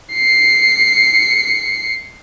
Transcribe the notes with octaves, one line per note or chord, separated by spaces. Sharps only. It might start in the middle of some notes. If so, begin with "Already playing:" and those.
C7 C#7